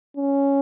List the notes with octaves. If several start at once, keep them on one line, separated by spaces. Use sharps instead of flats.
C#4